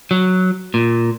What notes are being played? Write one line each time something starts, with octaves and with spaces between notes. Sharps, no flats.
F#3
A#2